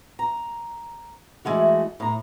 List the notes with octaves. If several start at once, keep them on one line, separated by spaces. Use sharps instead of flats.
A#5
E3 G#3 A3 F#4
A2 A#5